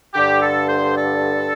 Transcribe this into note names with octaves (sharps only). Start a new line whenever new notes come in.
G2 D3 G4
A4
C5
A4